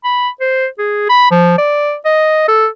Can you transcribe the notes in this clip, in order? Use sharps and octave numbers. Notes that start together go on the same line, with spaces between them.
B5
C5
G#4
B5
F3
D5
D#5
A4